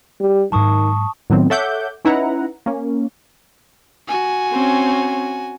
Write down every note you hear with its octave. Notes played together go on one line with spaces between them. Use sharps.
G3
G#2 D#3 F#3 A5 C#6 D#6
A2 D#3 F#3 B3 C4
A4 C#5 E5 F#5 D6 G6
C#4 D#4 E4 B4 F#5 A#5
A#3 C#4
F#4 G#5
C4 C#4